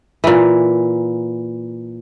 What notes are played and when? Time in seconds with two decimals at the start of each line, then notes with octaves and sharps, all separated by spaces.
0.24 A#2 E3